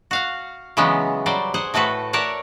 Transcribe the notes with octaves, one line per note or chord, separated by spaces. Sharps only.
F#4 F5 F#5
C#3 E3 F#3 G#3 B3 C#4
F#3 G3 C5 D5
G#4 C5 F#5
A2 A3 F#4 A4 B4
A#4 C#5 D5 E5 F#5 A5